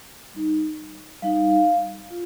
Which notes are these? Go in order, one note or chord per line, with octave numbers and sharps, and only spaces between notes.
G3 D#4
G3 D#4 F5
F4